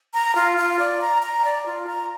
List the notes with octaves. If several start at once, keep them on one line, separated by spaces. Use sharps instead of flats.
A#5
F4
F4
D5
A#5
A#5
D5
F4
A#5